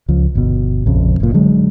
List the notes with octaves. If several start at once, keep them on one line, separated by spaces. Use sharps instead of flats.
C#2 F3
G1 B2
A#1 F2 C#3
F#1 A#2
D3 F#3 G#3